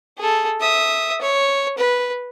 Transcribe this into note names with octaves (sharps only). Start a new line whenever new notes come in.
G#4 A4
E5 D#6
C#5
B4